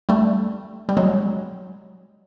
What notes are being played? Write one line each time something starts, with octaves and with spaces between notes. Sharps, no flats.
G3 A3
G3
F#3 G#3